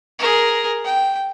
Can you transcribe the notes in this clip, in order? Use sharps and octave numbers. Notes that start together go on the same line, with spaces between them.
G#4 A#4
G5